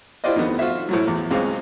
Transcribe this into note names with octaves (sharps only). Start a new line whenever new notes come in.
E4 F4 G4 C5 D5 D#5
F2 D#3 A3 B3
F4 F#4 C5 E5
A2 F3 F#3
E2
C#2 G#2 C#3 C4 F5